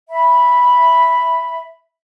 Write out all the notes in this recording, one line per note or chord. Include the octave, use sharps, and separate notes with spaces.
E5 B5